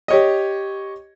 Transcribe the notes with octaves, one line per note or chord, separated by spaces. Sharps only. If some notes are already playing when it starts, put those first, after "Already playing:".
G4 C#5 D#5